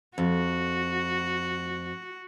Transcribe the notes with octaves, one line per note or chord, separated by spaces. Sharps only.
F2 F#4